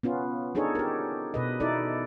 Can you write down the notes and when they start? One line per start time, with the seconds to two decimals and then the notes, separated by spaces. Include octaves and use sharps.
0.03 B3 C#4 F4
0.55 D4 D#4 G#4 A4 C#5
0.75 G4 A#4
1.34 B2 B4 D#5
1.60 D#4 E4 A4 D5